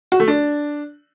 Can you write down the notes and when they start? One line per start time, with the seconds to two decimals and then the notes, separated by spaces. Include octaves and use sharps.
0.12 F#4
0.20 A3
0.28 D4